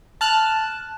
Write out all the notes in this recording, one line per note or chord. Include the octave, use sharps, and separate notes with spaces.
A5 F6 F#6